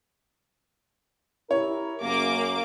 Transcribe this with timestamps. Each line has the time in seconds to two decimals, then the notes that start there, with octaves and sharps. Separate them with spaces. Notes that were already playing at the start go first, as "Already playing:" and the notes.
1.51 E4 G4 A#4 C#5
2.02 F#2 C#3 A#3 D6